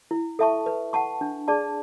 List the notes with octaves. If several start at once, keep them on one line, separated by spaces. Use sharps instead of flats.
E4
A4 E5 A5 C#6
B4
F#5 A5 C#6
D4
G#4 D5 A5